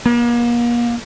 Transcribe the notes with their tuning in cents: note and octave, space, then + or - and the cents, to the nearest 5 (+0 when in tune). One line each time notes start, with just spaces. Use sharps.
A#3 +40